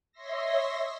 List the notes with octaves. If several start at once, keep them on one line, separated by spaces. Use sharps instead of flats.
C#5 D#5 E5 C6 E6 A#6